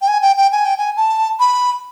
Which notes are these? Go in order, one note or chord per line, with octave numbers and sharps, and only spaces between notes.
G5
G#5
G5
G5
G#5
G5
G#5
A5
B5